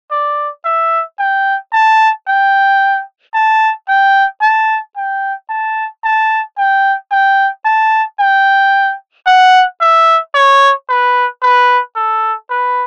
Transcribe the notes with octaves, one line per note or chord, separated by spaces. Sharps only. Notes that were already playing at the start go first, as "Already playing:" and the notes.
D5
E5
G5
A5
G5
A5
G5
A5
G5
A5
A5
G5
G5
A5
G5
F#5
E5
C#5
B4
B4
A4
B4